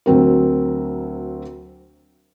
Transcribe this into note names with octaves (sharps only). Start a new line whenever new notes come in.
D2 F#3 C4 A#4